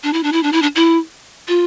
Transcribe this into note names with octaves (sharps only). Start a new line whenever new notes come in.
D4
E4
D4
E4
D4
E4
D4
E4
F4